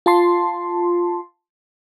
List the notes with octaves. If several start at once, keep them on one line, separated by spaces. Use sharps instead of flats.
F4 A5 C6